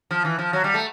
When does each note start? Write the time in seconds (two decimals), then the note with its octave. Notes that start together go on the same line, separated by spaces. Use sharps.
0.11 F3
0.25 E3
0.39 F3
0.53 F#3
0.64 G3
0.74 A3